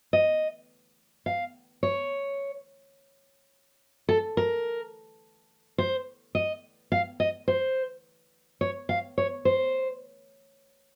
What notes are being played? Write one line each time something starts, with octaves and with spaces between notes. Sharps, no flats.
D#5
F5
C#5
A4
A#4
C5
D#5
F5
D#5
C5
C#5
F5
C#5
C5